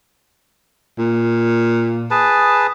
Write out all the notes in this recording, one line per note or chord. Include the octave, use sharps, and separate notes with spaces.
A#2
G#4 B4 A5